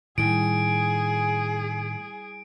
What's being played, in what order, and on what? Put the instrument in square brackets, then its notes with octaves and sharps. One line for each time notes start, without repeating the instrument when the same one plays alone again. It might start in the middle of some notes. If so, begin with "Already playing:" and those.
[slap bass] A2 D#3 [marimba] G3 E4 [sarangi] G#4 [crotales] D7